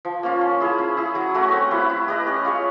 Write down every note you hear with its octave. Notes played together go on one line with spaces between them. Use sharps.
F3
A#3 C#4 F4
C#4
E4 G#4 C5
C#4
E4 G#4
F#3
A3 C#4 F#4
C4
E4 G4 B4
E4
G4 B4 D#5
C#4
F4 G#4 C#5